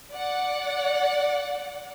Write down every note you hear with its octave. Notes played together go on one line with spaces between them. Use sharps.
D5 F#5